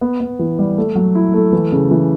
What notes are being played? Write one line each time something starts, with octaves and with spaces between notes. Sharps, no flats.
B3
B3
E3
G3
A3
F#3
E4
A3
E3
C#3
E3